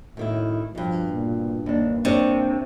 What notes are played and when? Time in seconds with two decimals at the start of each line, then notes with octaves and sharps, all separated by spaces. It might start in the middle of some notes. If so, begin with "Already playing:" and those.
0.17 F#2 A2 D#3 E4
0.75 G2 B2 F3
1.07 A#2
1.66 D#2 A#3 D4
2.05 C3 D4 C#5